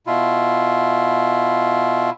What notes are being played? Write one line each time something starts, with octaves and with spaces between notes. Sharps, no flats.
B2 E4 F4